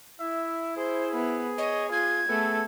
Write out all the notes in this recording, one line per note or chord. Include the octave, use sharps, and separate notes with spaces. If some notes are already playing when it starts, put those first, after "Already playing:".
E4 E5
G#4 C5
B3
C#5 D#5
F4 G#6
A3 B3 G#4 A4